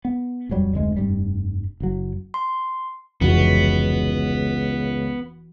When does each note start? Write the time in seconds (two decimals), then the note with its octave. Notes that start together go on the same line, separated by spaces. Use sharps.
0.05 B3
0.49 D#1 F2 F#3 G3
0.73 F1 D2 G#3
0.97 F1 G2 G3
1.80 F#1 F#3
2.34 C6
3.21 F1 C#2 E3 B3 F#4